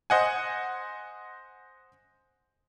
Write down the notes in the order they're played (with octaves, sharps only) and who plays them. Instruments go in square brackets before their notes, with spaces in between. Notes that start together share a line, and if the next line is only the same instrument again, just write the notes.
[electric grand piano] C5 D#5 F#5 G#5